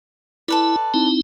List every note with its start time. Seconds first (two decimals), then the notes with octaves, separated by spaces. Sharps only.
0.48 E4 A4 B4 D5
0.94 C4 D#4 E4